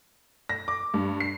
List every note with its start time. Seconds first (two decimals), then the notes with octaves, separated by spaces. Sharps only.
0.49 A#6
0.68 D6
0.94 G2
1.20 C7